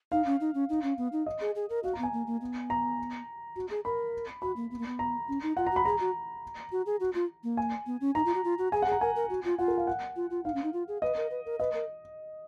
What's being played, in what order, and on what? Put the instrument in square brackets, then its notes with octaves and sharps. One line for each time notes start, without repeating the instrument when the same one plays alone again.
[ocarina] D#4 [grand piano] F5
[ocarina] C#4
D#4
C#4
D#4
C#4
B3
D#4
[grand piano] D#5
[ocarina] G#4
G#4
A#4
[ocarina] F#4 [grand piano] F5
[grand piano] A#5
[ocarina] B3
[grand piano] G#5
[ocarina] A#3
A#3
B3
[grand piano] A#5
[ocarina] F#4
G#4
[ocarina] A#4 [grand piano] B5
[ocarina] F#4 [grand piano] B5
[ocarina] A#3
B3
A#3
B3
[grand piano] A#5
[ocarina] C#4
D#4
[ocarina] F4 [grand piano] F#5
[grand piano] A#5
[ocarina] F#4 [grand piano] B5
[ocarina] G#4 [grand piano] A#5
[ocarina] F#4
F#4
G#4
F#4
F4
A#3
[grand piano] G#5
[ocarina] B3
C#4
[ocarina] D#4 [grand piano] A#5
[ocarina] F4
F#4
F4
F#4
[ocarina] G#4 [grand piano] G#5
[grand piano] F#5
[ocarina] G#4 [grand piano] A#5
[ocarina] A#4 [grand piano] G#5
[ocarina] A#4
F#4
F4
[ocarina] F4 [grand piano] F#5
[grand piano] A#4
F5
F#5
[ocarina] F4
F4
[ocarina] D#4 [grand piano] F5
[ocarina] C#4
D#4
F4
G#4
[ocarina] B4 [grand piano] D#5
[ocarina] A#4
B4
A#4
[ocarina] B4 [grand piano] D#5
[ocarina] A#4